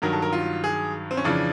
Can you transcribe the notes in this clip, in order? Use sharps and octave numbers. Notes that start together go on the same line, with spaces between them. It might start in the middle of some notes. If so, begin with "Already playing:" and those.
G2 D#3 F#3 A#4
A4
A#4
F4
G#4
C4
C#4
F2 C#3 E3 D4